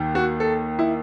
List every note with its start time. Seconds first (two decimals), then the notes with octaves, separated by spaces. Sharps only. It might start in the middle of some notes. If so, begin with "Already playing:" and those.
Already playing: D#2 D#3
0.15 F#4
0.40 A4
0.79 E4